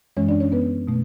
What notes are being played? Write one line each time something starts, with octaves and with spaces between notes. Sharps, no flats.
F#2 E3 G#3 C#4 C#5
D4 D5
C#4 C#5
B3 B4
B2 A3